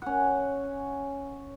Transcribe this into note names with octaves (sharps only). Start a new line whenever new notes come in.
C#4 F#5